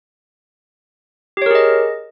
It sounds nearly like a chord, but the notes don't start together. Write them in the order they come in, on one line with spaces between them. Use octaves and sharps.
G4 C#5 A#4 G#4 D#5